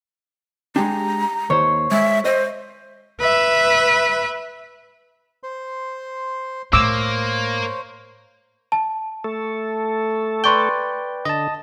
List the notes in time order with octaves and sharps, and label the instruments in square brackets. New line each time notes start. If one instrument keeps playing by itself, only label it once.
[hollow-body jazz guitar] G#3 D4 [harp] G4 [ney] A#5
[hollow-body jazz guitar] D#2 [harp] C5 C#5
[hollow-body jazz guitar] G#3 [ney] E5
[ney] C5 [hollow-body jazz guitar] D#5
[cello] B4 E5
[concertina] C5 C6
[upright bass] A2 [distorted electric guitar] A#3 [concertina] C5 C#5 [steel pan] D6 E6
[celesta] A5
[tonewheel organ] A3 A4
[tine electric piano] B4 D5 G5 [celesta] C6 C#6 G7
[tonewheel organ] D3 [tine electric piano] D#5 A5